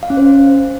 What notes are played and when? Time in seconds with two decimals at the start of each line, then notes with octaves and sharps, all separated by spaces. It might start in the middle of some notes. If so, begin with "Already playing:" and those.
0.03 F5
0.10 C#4
0.17 C5